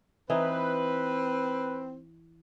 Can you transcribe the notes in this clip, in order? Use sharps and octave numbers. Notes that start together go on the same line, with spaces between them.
E3 C4 D#4 B4